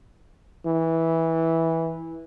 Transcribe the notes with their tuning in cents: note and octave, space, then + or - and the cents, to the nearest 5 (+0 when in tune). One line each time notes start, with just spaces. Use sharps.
E3 -10